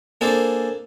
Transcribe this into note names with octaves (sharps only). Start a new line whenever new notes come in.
A#3 D4 G#4 A4 C5